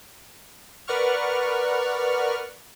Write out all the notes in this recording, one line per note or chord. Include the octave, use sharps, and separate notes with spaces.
A#4 B4 D5 F#5 C#6 F6